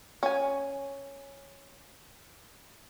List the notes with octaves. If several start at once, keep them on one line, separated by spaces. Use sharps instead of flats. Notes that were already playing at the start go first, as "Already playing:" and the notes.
C#4 G#5